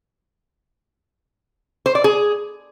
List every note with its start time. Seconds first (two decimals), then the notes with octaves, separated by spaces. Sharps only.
1.86 C5
1.95 D5
2.04 G#4